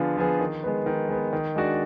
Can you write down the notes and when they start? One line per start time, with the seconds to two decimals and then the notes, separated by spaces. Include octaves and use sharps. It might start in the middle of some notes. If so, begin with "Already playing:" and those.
Already playing: D3 F3 B3 F4 G#4
0.17 F3 B3 F4 G#4
0.40 D#3
0.63 G#3 B3
0.86 D#3
1.09 G#3 B3
1.33 D#3
1.55 G#3 D4 F#4 D5